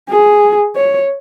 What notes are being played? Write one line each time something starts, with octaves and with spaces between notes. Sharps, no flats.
G#4
C#5